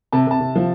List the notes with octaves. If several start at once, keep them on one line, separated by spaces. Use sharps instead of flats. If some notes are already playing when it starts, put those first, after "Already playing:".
C3 A5
C3 A5
C3
F3